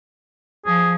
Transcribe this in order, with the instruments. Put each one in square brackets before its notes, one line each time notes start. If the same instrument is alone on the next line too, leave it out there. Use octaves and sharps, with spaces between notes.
[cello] F3 [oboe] G#4